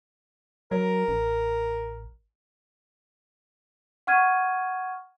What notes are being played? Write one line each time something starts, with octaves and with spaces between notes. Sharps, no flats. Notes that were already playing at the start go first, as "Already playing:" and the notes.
F#3 A#4
A1
F#5 C#6 F6 G#6 D#7